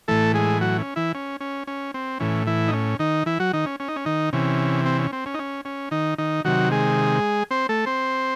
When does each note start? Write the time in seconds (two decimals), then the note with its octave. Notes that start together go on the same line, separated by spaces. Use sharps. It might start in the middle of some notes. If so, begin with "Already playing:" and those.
0.08 A2 E3 A3 A4
0.34 G#3 G#4
0.61 F#3 F#4
0.78 C#4
0.96 E3 E4
1.15 C#4
1.40 C#4
1.67 C#4
1.94 C4
2.20 A2 E3 C#4
2.47 E3 E4
2.68 D#4
2.73 C#4
2.99 D#3 D#4
3.26 E3 E4
3.40 F#3 F#4
3.53 D#3 D#4
3.66 C#4
3.80 C#4
3.88 D#4
3.96 C#4
4.05 D#3 D#4
4.33 C3 E3 C#4
4.86 C4
4.99 C#4
5.13 C4
5.26 C#4
5.34 D#4
5.39 C#4
5.65 C#4
5.91 D#3 D#4
6.18 D#3 D#4
6.45 C3 D#3 F#3 F#4
6.71 G#3 G#4
7.51 C4 C5
7.69 A3 A4
7.86 C4 C5